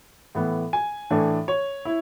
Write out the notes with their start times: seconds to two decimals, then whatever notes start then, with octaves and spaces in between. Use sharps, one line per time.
0.35 A2 E3 B3
0.73 G#5
1.10 A2 E3 A3 D4
1.48 C#5
1.85 E4